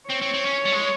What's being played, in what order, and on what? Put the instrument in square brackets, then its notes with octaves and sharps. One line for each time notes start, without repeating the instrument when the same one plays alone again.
[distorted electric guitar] C4 [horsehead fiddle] C#5
[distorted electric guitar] C4
C4
C#4
G3
G#3